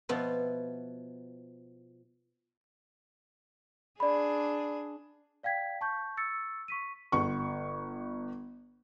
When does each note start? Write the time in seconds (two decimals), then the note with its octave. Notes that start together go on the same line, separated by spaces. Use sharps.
0.09 B2 F3 B3 E4
4.00 D4 G#4 D5 B5
5.43 D5 F5 G5 G#6 B6
5.81 A5 C#6 G6
6.17 C#6 E6 A6 C#7
6.68 C#6 B6 D#7
7.12 G1 C#6